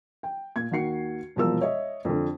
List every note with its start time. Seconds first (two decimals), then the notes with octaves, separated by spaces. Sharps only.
0.23 G5
0.56 A#2 G#6
0.71 D#2 D#3 F#4 C7 C#7
1.36 E1 C2 B2 F3 A#4 E6
1.61 C#5 D#5 E5
2.05 F2 D3